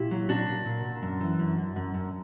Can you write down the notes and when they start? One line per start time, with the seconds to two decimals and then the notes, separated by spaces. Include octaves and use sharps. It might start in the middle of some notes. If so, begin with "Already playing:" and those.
Already playing: A#2 E4 G4
0.11 F#3
0.29 A#2 D4 F#4
0.48 A#2
0.65 A#2
0.85 A#2
1.02 F#2
1.21 E3
1.39 F#2
1.58 F#2
1.76 F#2
1.94 F#2